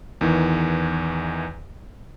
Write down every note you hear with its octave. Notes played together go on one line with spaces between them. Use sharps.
E2 D#3 E3